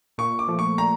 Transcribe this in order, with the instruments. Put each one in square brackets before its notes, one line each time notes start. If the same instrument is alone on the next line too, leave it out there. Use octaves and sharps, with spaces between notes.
[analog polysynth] A#2 [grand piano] C#6
[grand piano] D6
[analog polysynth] F3 A3
[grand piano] C#6
[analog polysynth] A#2 [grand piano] A#5